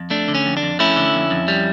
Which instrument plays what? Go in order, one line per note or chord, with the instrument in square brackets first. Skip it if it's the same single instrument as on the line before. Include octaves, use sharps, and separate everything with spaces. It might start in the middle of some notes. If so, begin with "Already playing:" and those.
Already playing: [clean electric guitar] F2
A3 D4
D3
C#4
F2
D4
F2
A3 C#4 E4
D3
F2
F2
G3